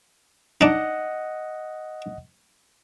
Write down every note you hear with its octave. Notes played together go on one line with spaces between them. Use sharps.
D4 D#4 D#5 F#5